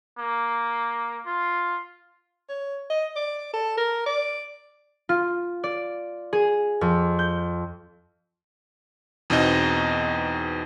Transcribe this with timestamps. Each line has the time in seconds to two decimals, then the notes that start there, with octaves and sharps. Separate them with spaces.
0.19 A#3
1.26 F4
2.49 C#5
2.90 D#5
3.16 D5
3.53 A4
3.77 A#4
4.06 D5
5.09 F4
5.64 D5
6.33 G#4
6.81 F2
7.19 G6
9.30 E2 B2 C4 D#4 D#5